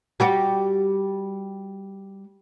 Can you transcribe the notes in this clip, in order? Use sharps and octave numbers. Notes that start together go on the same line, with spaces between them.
G3 F#4 G4